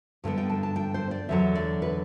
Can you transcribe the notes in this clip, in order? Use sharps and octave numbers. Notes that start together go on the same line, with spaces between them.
G2 D3 G3 B3
G5
A5
A5
G5
C5
D5
E2 D3 F#3 E5
D5
B4